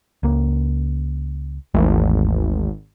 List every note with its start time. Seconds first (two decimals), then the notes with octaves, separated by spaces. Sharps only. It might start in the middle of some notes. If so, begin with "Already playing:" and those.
0.23 C#2 A#3
1.74 G#1 D#2 E3 A3